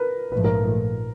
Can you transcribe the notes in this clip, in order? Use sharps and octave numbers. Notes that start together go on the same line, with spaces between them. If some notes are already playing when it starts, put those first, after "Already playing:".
Already playing: A#4 B4
A#1 G#2 F3 A3 B4
A#4